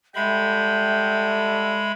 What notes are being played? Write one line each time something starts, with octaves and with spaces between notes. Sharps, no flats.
G3 G#3 F#4 A4 E5 G5 B5